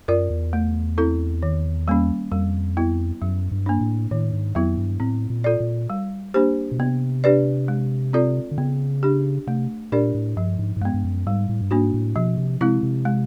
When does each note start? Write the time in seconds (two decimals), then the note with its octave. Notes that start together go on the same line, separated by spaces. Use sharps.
0.08 F#2 F4 A#4 D5
0.30 E2
0.53 A3
0.98 C4 E4 A4
1.43 D#3
1.88 G3 A#3 C#4
2.32 F2 G3
2.77 B3 E4
3.22 F#2 F#3
3.52 G2
3.66 A#3 D4
3.81 A2
4.11 A2 D#3
4.33 G#2
4.55 F2 F#3 B3 E4
4.78 G2
5.00 A2 C4
5.30 A#2
5.44 F4 A4 D5
5.60 A#2
5.90 G3
6.34 A#3 D4 G4 C5
6.72 B2
6.79 C3 B3
7.24 D4 G4 B4 D5
7.68 G#3
8.13 C4 F4 A4 D5
8.51 D3
8.58 C#3 B3
9.03 D4 G4
9.47 C3 A3
9.92 A#2 D4 G4 A#4 D5
10.15 A2
10.37 G2 F3
10.59 G#2
10.77 G#2
10.82 G2 G#3
10.85 B3
10.94 G2
11.05 F#2
11.26 G#2 G3
11.49 A2
11.61 G2
11.71 G#2 A#3 D4 F#4
11.94 A2
12.16 B2 F3
12.38 C3
12.61 C3 G#3 C4 E4
12.83 C3
13.05 G#3